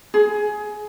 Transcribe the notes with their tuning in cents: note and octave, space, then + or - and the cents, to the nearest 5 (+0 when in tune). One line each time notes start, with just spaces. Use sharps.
G#4 +15